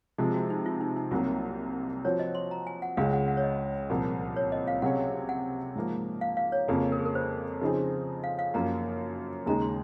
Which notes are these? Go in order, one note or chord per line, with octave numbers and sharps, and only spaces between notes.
C3 F3 G#3
F#4
D#4
F4
D#4
D#4
C2 C3 F#3 A#3 F4
F3 C4 F#4 C#5
D#5
C6
A#5
G#5
F#5
C#2 C#3 G#3 C#4 F5
F#5
F#5
C#5
D#5
C2 A#2 F3 A#3
C#5
D#5
F5
C3 F#3 C#4 G#4 C#5 F#5
F#5
G#2 F3 A#3
F5
F5
C#5
F2 C#3 F3 A#3 C#4
A#4
G#4
A#4
C5
C#3 F3 C4 D#4 G#4
F5
F5
F#2 F3 A#3 A#5
D#2 C#3 G#3 D#4 G#4 A#5
C6